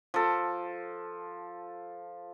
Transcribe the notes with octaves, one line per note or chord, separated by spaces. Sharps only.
F3 A4